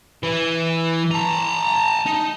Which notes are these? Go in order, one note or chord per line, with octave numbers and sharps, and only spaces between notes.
E3
A5 A#5
D#4